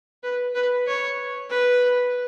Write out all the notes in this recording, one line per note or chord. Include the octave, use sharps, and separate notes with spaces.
B4
B4
C#5
B4